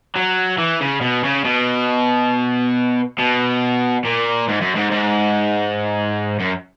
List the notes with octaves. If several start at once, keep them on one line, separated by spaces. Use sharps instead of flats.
F#3
E3
C#3
B2
C#3
B2
B2
A#2
G#2
F#2
G#2
G#2
F#2